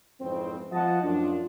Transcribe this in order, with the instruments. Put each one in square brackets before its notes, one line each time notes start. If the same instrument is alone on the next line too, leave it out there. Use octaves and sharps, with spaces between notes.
[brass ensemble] F2 G#2 C#3 E3 C4
F3 D#5 F#5 A5
F#2 A2 D4 F4